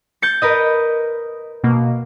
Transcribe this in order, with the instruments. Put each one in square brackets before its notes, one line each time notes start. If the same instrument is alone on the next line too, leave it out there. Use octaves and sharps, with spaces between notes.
[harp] G6 A6 C#7
A#4 B4 D#5
[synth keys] B2 A#3